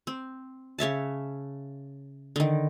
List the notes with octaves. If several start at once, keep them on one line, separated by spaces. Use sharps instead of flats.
C4
C#3 C#5 E5 A5
D3 D#3